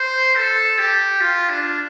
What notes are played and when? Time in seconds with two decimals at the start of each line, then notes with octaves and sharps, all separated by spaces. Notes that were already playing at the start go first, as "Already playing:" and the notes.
Already playing: C5
0.36 A4
0.79 G4
1.21 F4
1.50 D4